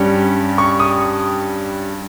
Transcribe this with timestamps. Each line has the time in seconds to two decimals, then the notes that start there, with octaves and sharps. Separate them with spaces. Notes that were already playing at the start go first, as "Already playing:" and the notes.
Already playing: G2 G3 C#4
0.58 C#6
0.80 D#6